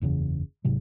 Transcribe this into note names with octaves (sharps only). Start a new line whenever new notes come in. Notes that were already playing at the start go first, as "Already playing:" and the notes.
F#1 E2 A2 C#3
G#1 G#2 C3 F#3